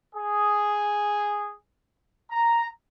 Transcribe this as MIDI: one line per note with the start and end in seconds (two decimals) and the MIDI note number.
0.15 1.52 68
2.30 2.66 82